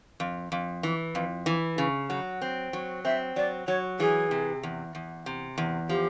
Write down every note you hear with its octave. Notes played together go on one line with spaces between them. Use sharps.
F2
F2
E3
F2
E3
C#3
F#3 F#5
C4
F#3
C4 E5
F#3 D5
F#3 C#5
E3 G#4
C3
E2
E2
C3
E2
F3 G4